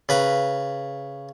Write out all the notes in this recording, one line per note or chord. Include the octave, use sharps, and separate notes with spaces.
C#3 B4 A#5